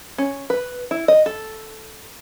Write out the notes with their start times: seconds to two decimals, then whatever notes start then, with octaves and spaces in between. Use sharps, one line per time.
0.18 C#4
0.50 B4
0.91 E4
1.08 D#5
1.26 A4